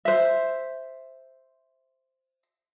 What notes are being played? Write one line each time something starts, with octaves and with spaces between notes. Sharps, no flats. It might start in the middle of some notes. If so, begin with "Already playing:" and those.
C5 E5